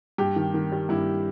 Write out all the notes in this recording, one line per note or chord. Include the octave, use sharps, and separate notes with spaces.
G2 G4
D#3
D#3
G3
G2 E4